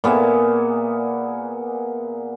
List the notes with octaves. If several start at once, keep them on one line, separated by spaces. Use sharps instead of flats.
A#2 B3 G#4 E5